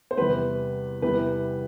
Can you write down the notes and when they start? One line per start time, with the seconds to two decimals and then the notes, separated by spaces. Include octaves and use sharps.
0.11 C5
0.17 E2 C3 G3 B4
1.02 E2 C3 E3 G3 B4